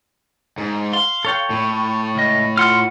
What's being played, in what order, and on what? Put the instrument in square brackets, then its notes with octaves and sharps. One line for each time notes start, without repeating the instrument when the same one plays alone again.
[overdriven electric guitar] G#2
[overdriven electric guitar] F5 [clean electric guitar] C6
[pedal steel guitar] A4 C#5 G5
[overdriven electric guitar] A2
[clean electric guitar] C#2 D#5
[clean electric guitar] F4 F#5 [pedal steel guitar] C6 F6